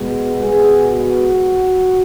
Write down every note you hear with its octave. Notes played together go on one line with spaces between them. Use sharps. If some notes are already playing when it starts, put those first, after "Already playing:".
Already playing: B2 G#3 B3
B2 G#3 B3 G#4
F#4